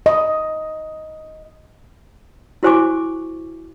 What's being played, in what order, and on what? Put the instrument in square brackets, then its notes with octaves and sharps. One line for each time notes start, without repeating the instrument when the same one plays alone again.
[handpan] D#5
[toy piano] E4 F#4 C5 G#5 C#6 D6